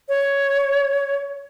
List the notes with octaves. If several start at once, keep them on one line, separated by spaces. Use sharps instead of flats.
C#5